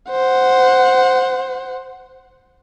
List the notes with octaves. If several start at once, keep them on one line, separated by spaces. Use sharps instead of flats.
C5 F#5